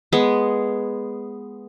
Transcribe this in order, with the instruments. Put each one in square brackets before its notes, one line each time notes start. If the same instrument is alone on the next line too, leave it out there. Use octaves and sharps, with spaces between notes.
[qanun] G#3 B3